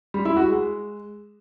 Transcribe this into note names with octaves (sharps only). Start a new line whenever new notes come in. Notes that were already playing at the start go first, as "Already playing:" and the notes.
G3
E4
F#4
G#3